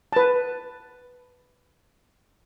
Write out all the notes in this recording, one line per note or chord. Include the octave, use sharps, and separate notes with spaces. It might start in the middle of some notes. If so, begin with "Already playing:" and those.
B4 A5